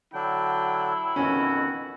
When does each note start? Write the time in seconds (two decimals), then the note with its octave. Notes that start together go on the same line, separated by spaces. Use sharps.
0.14 D3 F#3 D4 E4 G5
1.16 F2 B2 D#3 C#4 F#4